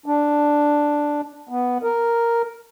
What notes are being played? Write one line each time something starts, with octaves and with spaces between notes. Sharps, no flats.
D4
B3
A#4